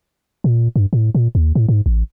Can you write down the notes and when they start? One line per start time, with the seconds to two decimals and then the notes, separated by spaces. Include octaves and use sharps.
0.44 A#2
0.76 G2
0.93 A2
1.15 A#2
1.35 D#2
1.55 A2
1.69 G#2
1.86 A1